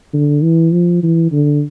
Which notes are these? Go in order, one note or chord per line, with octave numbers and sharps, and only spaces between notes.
D3
E3
F3
E3
D3